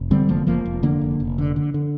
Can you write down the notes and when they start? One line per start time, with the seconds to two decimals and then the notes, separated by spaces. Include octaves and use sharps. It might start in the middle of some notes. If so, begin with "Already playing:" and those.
Already playing: F1
0.11 D3 G3 C4
0.29 F1 F3 A#3
0.47 F1 F3 A#3
0.66 F1
0.83 D3 A#3 D4
1.01 F1
1.20 F1
1.38 D3
1.56 D3
1.74 D3